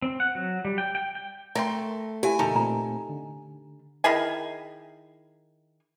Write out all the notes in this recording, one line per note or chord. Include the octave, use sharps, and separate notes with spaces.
C4
F#5
F#3
G3
G5
G5
G5
A3 A#4 E5 G5 C6
E4 G4 E5 G#5
E2 A#2 C#3 D#4 A4 A#4
A#2 A3 C4 A#5
D3
D#3 E4 G#4 G#5